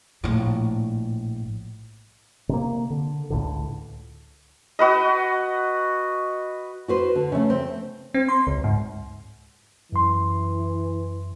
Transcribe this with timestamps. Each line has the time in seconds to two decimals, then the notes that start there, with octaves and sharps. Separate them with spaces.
0.24 A#1 A2
2.49 C3 A#3
2.90 D3
3.30 C#2 A2 D3
4.79 F#4 B4 D#5
6.88 F#4 B4 C5
7.15 D3
7.32 C#3 A3
7.50 C4
8.14 C4
8.29 C6
8.47 C#2
8.64 G#2
9.92 F#2 E3 C6